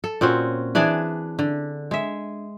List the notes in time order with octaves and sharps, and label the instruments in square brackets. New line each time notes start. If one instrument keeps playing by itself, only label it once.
[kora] A4
A#2 C4 C#4 F#4
E3 D4 G#4 D5
D3
G#3 E5